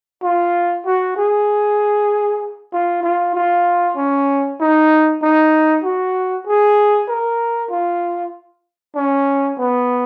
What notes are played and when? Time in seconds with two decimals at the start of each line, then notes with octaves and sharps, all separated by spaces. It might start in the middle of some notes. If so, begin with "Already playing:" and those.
0.23 F4
0.86 F#4
1.17 G#4
2.73 F4
3.03 F4
3.35 F4
3.97 C#4
4.60 D#4
5.22 D#4
5.84 F#4
6.47 G#4
7.09 A#4
7.71 F4
8.96 C#4
9.58 B3